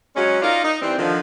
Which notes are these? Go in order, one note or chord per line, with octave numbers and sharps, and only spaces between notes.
F#3 G#3 C#4
D#4 F4 A#4 D5 F5
D#4
E3 G3 C4
D3 D#3 F3